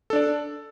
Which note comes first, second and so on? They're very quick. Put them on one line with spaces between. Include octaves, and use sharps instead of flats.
A4 D4 D5